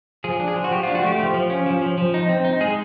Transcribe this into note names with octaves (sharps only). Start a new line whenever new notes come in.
F3 G#4
D4
G#4
F3
F#4
F3 G4
D4 F4
F#4
A3 G4
F3 G4
F3
C#4
F3
F3
F3
D#4
C4
D#4
G#3 G#4